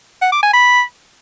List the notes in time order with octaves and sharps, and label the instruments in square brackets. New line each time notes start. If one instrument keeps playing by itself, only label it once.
[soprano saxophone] F#5
D6
G#5
B5